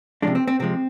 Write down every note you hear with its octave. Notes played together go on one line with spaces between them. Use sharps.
C3 F3 G#3 D4
C4
C4
C3 F3 G#3 C4